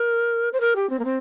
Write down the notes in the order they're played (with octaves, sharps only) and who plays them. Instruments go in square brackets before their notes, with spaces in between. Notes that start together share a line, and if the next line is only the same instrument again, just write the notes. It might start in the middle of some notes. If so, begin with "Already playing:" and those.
Already playing: [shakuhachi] A#4
C5
A#4
G4
C4
A#3
C4